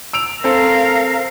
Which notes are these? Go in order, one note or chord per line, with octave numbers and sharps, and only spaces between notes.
E6 D7 F7
C4 A4 A#4 F5